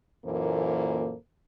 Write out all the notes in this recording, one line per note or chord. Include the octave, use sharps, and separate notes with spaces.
F#2 A#2 E3 A#3 A4 C5